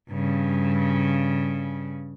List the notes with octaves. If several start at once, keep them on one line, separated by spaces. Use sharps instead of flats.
G2 C#3